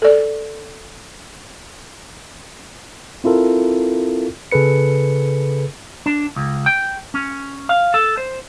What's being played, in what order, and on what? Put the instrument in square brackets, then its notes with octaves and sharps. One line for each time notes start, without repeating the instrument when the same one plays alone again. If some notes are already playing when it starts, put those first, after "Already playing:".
[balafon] A4 D5
[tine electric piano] C4 E4 F4 A4 A#4
C#3 G#4 A4 B4 C#7
[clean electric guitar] D4
C#2
G5
C#4
F5
A4
C5